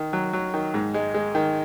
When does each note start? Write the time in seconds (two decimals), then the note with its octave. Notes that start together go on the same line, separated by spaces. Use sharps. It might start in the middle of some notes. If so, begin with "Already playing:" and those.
Already playing: D#3
0.13 F#3
0.33 F#3
0.54 D#3
0.74 G#2
0.94 G#3
1.14 G#3
1.35 D#3